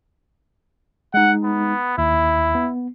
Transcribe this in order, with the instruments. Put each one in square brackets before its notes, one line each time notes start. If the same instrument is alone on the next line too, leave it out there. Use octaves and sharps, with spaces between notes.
[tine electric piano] G#3 D#4 [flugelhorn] F#5
[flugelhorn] B3
[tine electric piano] D#2 [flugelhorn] E4
[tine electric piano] B3